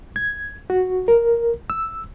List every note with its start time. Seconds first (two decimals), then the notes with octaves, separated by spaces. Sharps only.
0.16 G#6
0.70 F#4
1.08 A#4
1.70 E6